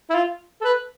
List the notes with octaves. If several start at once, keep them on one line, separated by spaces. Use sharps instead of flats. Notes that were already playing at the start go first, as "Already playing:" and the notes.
E4
F4
A4
B4